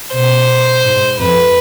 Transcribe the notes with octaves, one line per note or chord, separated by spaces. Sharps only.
B2 C5
G#2
F2 B4